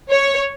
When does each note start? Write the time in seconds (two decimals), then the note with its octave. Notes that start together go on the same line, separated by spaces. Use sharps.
0.10 C#5